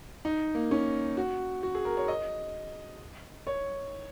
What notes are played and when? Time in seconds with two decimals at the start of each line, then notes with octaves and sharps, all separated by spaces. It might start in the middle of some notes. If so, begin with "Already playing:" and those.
0.25 D#4
0.55 A#3
0.71 C#4
1.17 F#4
1.63 F#4
1.75 G#4
1.85 A#4
1.97 C#5
2.08 D#5
3.47 C#5